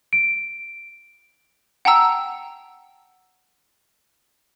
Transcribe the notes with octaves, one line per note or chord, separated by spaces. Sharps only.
D7
F#5 G5 A5 A#5 E6